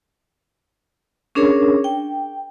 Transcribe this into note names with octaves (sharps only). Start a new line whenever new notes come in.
C#4 D4 G#4 A#4 C#5
G5